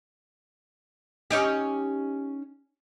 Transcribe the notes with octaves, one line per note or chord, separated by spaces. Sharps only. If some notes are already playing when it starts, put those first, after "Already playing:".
C#4 D#4 G4